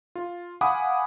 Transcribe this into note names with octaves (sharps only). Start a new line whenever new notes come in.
F4
F5 F#5 G#5 B5 D6 D#6